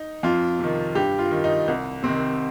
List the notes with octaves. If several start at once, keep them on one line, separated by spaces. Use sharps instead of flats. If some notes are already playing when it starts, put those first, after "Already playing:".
Already playing: D#4
F2 F4
C3 D#3
G2 G4
F4
D#3
D#4
C2
C3 D#3 C4